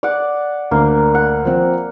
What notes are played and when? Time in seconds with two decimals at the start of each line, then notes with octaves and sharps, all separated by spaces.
0.03 D5 F#5
0.71 D2 A#3
1.15 F#5
1.45 F3 C4